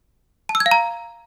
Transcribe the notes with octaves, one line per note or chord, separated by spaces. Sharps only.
A5
E6
G#6
F5
A#5